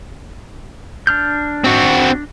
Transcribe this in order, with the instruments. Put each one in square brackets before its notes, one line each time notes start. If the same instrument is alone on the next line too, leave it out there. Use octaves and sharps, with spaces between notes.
[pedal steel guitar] D4 F6 G6
[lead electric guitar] C4 F#4